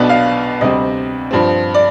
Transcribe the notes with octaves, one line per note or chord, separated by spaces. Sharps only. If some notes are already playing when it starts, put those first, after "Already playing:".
Already playing: B1 B2 B3 D4
F5
D2 C3 G3 C4 D#5
G2 F3 C4
D5